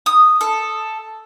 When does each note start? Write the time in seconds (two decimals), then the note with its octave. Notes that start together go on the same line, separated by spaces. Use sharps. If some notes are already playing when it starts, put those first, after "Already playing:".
0.06 D#6
0.41 A4